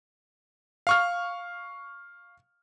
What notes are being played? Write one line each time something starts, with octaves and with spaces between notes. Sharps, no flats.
F5 C#6 F6